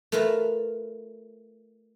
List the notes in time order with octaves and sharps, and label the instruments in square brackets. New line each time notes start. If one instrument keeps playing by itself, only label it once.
[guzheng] A3 F4 A#4 B4 A5